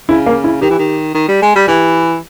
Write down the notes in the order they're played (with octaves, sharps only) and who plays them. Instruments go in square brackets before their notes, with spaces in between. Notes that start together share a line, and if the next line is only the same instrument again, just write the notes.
[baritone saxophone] C#3 [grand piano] E4
[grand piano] A#3
E4
[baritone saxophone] D#3 [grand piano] G4
[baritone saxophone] E3
D#3
D#3
G3
G#3
G3
[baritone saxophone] E3 [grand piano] G4